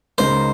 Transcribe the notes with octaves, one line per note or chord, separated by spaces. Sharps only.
C#2 C#3 G#3 D#4 A#4 C5